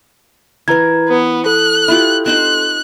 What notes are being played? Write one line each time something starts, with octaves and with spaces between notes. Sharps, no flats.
E3 A#4 B4 A#5 G#6
B3
A4 F#6
E4 F4 G4
C4 D#4 C5 F#6